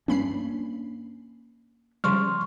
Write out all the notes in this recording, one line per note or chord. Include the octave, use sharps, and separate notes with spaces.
G2 A#3 C#4 D4 B5 C7
C#3 F3 G3 C6 C#6 F6